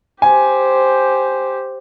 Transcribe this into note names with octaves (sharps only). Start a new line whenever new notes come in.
G4 C5 G#5